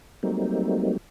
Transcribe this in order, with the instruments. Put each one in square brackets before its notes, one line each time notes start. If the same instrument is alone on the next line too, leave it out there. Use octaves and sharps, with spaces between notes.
[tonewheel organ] F#3 G3 A3 A#3 C4 D#4